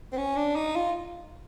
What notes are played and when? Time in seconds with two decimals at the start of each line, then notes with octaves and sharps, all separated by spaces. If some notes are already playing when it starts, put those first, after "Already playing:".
0.13 C4
0.17 C#4
0.36 D4
0.56 D#4
0.76 F4